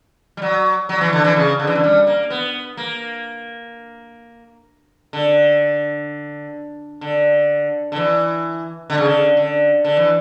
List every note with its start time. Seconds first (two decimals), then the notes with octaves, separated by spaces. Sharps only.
0.37 G3
0.42 F#3
0.89 F#3
1.01 E3
1.13 D3
1.24 E3
1.36 C#3
1.60 D3
1.67 E3
1.75 D3
1.83 G3
2.07 A#3
2.30 B3
2.77 A#3
5.13 D3
7.01 D3
7.92 D3
7.96 E3
8.90 D3
8.98 C#3
9.06 D3
9.37 D3
9.85 D3
9.97 E3